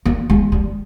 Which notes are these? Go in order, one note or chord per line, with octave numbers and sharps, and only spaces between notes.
A#3
G#3
G3